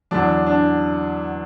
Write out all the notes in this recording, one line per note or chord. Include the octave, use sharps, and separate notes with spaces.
E2 D3 F#3 D4
D4